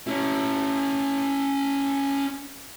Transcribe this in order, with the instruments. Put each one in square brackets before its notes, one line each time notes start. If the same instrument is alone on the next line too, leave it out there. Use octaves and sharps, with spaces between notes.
[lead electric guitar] C#4 E4